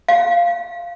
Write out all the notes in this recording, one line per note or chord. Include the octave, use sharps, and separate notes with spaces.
F5